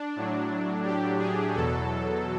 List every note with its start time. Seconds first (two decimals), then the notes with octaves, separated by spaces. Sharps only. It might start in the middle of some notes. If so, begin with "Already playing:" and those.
Already playing: D4
0.16 A2 F#3
0.85 G4
1.19 G#4
1.55 E2 B2 F#3 A4